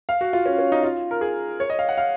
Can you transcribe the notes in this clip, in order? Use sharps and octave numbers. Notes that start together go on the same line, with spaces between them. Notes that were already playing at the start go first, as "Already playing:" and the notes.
F5
F#4
F4
C#4
C#4
D#4
F4
A#4
G#4
C#5
D#5
F5
F#5
F5